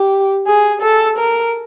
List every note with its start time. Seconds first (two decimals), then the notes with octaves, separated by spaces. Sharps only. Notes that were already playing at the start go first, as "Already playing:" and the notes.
Already playing: G4
0.47 G#4
0.82 A4
1.18 A#4